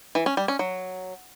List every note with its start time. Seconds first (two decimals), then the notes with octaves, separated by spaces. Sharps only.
0.15 E3
0.26 C#4
0.37 G3
0.48 C#4
0.59 F#3